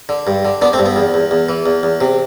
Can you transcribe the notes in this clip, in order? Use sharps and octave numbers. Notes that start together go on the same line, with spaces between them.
D3
G2
D3
D3 B3 D4
A3 C4
G2
B3
E2
E2
E2
E3
E2
E2
C3